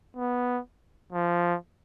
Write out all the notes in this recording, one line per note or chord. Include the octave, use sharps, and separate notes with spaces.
B3
F3